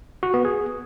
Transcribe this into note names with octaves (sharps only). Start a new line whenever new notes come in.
F#4
B3
G#4